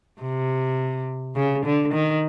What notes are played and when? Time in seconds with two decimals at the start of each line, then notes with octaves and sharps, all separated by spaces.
0.22 C3
1.36 C#3
1.65 D3
1.93 D#3